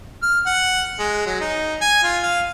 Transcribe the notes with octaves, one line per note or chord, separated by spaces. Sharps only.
F6
F#5
G#3
F#3
D#4
G#5
F4
F5